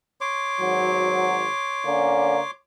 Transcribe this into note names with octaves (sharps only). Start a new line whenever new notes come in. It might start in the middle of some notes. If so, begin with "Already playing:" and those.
C#5 C6 D6
G#1 F#3
D3 A#3 C#4